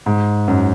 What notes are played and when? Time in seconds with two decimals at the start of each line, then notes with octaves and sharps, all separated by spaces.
0.06 G#2
0.48 F#2